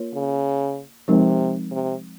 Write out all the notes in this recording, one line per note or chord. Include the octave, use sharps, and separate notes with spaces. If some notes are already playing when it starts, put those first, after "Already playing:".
Already playing: A#3 F4 A#4 C#5
C#3
C3 F3 G#3 C4 D#4 A#4
C3